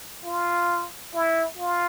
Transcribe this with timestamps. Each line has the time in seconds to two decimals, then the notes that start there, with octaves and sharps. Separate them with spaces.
0.25 F4
1.14 E4
1.58 F4